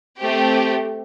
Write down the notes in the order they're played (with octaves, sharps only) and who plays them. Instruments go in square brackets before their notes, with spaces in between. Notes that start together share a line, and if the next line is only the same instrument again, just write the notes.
[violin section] A3 C4 G4